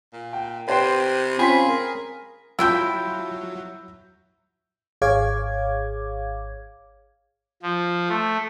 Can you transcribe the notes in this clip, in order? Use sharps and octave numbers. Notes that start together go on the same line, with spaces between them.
A#2
G5
C3 B4 C5 G5
C4 C#4 F4 G#4 B5 C6 B6
A#4
F#3 E4 F4 G5 A5 B5 E6 G6
G#1 G#4 C#5 F5 D6 G#6
F3
A3